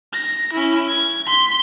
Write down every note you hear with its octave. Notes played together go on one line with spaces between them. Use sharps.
A#6
C#4 E4
G#6
C6 B6